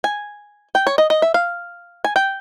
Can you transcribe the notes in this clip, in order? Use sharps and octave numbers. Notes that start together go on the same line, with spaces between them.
G#5
G5
C#5
D#5
D#5
E5
F5
G#5
G5